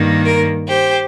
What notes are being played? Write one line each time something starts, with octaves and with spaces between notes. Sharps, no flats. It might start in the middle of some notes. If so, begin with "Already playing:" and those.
Already playing: G2 D#3 A#3
A#4
G4 C5